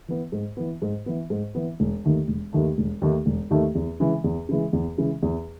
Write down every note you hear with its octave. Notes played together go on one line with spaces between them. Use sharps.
E3 B3
G#2
E3 B3
G#2
E3 B3
G#2
E3 B3
E1
D#2 D#3 A3
E1
D#2 D#3 A3
E1
D#2 D#3 A3
E1
D#2 D#3 A3
E2
C#3 E3 G#3
E2
C#3 E3 G#3
E2
C#3 E3 G#3
E2